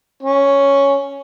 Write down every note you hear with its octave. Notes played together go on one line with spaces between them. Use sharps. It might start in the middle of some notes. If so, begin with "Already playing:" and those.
C#4